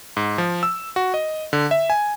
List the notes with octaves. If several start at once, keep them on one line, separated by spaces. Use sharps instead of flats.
G#2
F3
E6
F#4
D#5
D3
E5
G#5